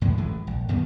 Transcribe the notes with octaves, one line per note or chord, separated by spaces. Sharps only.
F#2 A2 F3 G#3
A1 E3 G#3 A3
A#1
F#2 D#3 G3 B3